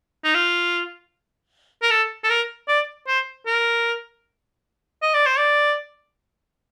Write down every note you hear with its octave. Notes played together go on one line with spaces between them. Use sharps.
D#4
F4
A#4
A4
A4
A#4
D5
C5
A#4
D#5
D5
C5
D5